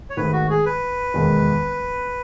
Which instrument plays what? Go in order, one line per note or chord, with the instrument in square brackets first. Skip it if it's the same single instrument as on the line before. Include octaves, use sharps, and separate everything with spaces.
[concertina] C#5
[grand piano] G#1 G#2 D#3 A3 [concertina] B4
[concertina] F#4
G#4
B4
[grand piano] E1 D#2 D#3 G#3